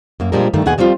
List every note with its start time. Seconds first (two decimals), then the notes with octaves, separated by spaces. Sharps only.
0.20 F#2 A#3
0.32 A#2 F3 G3 G#3 D4 A#4
0.54 G2 D3 D#3 A3
0.66 D#2 B2 D3 G#4 F#5 G#5
0.78 F3 G3 C4 D4 F4